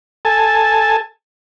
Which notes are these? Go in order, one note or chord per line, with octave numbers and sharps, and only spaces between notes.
A4 G#5 A5